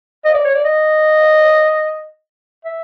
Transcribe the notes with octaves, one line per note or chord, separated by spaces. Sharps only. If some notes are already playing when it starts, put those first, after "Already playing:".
D#5
D5
C#5
D5
D#5
E5